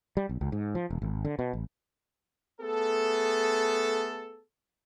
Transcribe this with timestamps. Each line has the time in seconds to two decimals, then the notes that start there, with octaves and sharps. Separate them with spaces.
0.17 G3
0.29 B1
0.41 C#2
0.52 G#2
0.75 F3
0.90 E1
1.02 G#1
1.25 D3
1.39 B2
1.53 A1
2.61 A3 B3 G#4 A4